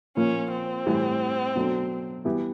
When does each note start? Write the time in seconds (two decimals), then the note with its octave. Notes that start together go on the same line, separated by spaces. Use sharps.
0.17 A#2 F3 A#3 C#4
0.51 C4
0.86 A2 E3 G3
1.56 B2 F#3 A3 D4
2.25 E3 G3 B3 E4 G4